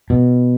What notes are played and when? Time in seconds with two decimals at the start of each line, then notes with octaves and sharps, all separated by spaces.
0.10 B2